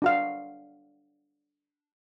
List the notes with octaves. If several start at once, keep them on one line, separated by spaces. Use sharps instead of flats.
D4 F#4 F5